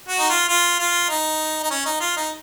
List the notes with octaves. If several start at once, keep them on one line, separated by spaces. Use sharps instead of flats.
F#4
D#4
F4
F4
F4
D#4
D#4
C#4
D#4
F4
D#4